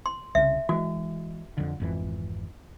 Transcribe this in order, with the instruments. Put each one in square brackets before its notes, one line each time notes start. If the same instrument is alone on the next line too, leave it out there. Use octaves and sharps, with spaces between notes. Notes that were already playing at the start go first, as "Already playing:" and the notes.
[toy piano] C6
[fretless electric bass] C2 C#3 [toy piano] E5
[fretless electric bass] E3 G#3 [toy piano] F#4
[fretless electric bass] F2 D3
G#1 F2 E3